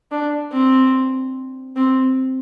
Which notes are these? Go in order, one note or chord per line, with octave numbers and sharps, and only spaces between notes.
D4
C4
C4